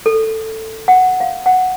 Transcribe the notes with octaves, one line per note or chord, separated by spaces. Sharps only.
A4
F#5
F5
F#5